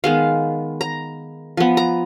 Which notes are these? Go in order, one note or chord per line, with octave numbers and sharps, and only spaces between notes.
D#3 G#3 B3 F5
A#5
F3 B3
A#5